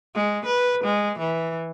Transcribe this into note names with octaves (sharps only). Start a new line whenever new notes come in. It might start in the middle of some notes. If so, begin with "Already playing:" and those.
G#3
B4
G#3
E3